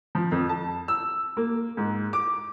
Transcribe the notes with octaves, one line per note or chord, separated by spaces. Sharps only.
F3
F2
A5
E6
A#3
G#2
D6